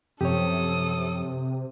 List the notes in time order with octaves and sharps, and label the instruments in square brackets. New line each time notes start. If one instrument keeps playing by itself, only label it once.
[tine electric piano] F#2 F3 [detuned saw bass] C3 [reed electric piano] G4 C#5 [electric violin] A4 D#6